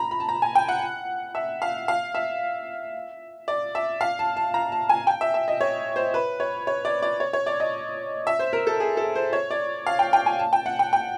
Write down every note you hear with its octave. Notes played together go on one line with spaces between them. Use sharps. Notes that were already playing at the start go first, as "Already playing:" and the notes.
Already playing: A#5 B5
B5
A5
A#5
G#5
G5
F#5
E5
F5
F5
E5
D5
E5
F5
A5
A5
A#5
A5
G#5
G5
E5
E5
D#5
C#5
C5
B4
C#5
C#5
D5
D5
C#5
C#5
D5
D#5
E5
C5
A#4
A4
G#4
A4
C5
C#5
D5
F5
G5
G5
G#5
A5
G5
F#5
G5
G5